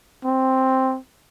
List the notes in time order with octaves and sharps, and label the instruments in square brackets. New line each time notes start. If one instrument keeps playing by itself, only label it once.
[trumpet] C4